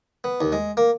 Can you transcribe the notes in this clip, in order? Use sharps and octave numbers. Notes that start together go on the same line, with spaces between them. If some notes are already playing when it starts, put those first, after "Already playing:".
B3
D#2
G#3
A#3